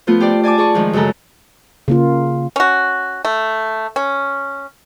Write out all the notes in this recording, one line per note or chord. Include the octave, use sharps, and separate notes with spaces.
F3 A3 B3 F4
G4 C5 D5
D5 G#5 A5 D6
G#4 D5 C#6
D#3 F3 G#3
F#2 C#3 G#3 A4 A#5
C#3 A#3 F4
C#4 F#4
A3
C#4